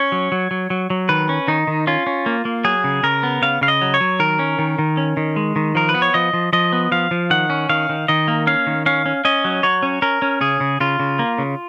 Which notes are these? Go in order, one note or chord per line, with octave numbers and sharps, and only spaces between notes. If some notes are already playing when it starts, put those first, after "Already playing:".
Already playing: C#4 C#5
F#3
F#3
F#3
F#3
F#3
D#3 B4
C#4
D#3 D#4
D#3
C#4 F4
C#4
A#3
A#3
F#3 G#4
C#3
C#3 A#4
B3
C#3 F5
C#3 F5
D#5
F#3
C#5
F#3
D#3 A#4
C#4
D#3
D#3
C#4
D#3
G#3
D#3
F3 A#4
B4
B3
C#5
F3 D#5
F3
F3 D#5
B3
F3 F5
F3
D#3 F#5
C#4
D#3 F5
D#3
D#3 D#5
A#3
C#4 F5
D#3
C#4 F5
C#4
C#4 D#5
F#3
F#3 C#5
C#4
C#4 A#4
C#4
C#3 G#4
C#3
C#3 F4
C#3
A#3
C#3